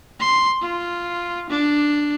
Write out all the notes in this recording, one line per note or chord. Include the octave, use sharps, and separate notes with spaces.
C6
F4
D4